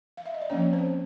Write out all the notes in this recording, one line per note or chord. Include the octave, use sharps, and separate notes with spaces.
F5
E5
D#5
D5
F3 A#3 C#4 D4 C#5
C4 C5